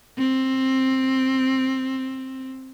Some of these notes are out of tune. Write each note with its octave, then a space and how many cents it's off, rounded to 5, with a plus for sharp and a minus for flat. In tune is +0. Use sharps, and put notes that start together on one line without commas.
C4 +10